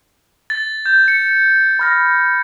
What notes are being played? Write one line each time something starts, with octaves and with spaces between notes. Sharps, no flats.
A6
G6
C#7
B5 F6 A#6